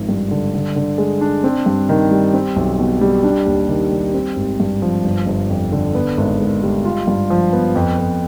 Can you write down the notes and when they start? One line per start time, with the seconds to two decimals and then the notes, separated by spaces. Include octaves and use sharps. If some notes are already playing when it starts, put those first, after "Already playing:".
Already playing: G#1 F3
0.09 G2
0.31 D3
0.54 D3
0.76 D3
0.98 G#3
1.21 D4
1.44 C4
1.66 G2
1.89 D#3
2.11 G3
2.34 C4
2.56 B1
2.79 B2
3.01 G3
3.24 D4
3.46 D#2
3.69 D#3
3.91 G3
4.14 C4
4.36 G#1
4.60 G2
4.82 F3
5.04 G1
5.26 G1
5.49 F2
5.72 D3
5.95 B3
6.18 G#1
6.40 G#2
6.63 G3
6.85 F4
7.07 G2
7.30 F3
7.53 B3
7.75 F2
7.98 F2